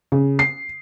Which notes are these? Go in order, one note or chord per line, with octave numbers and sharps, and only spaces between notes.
C#3
C7